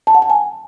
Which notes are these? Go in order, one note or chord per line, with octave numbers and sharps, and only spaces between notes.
A5
F#5
A5
G#5